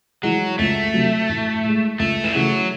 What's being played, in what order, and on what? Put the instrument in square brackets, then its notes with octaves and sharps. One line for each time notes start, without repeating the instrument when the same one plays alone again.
[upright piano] E3 G#3 [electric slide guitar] F#3
[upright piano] C#2 [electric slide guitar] A3
[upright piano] C3 F#3
A1
A2 G#3
[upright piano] C#2 [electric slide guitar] A3
[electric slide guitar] E3
[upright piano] C#3 E3 A3 [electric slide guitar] F#3